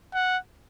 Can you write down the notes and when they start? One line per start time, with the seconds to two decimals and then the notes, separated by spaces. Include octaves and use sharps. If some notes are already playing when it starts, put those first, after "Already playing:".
0.14 F#5